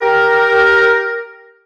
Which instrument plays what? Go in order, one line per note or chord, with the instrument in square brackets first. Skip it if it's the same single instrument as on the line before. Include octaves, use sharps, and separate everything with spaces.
[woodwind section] G4 A#4